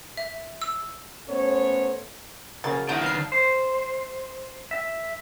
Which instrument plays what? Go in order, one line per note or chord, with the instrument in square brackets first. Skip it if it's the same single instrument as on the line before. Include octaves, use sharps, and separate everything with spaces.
[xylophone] E5
E6
[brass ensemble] A3 B3 C#4 A4 C5 C#5
[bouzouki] C#3 F3 [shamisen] F#3 A#3 C#4 [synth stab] A6
[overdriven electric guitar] D#3 D4 [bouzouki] C#4 E4 [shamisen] F#4 [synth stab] G6
[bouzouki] C#4 B4 [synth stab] F5 C7
[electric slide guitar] C5
E5